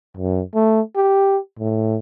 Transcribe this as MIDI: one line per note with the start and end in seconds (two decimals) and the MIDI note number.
0.17 0.41 42
0.54 0.81 57
0.96 1.38 67
1.59 1.98 45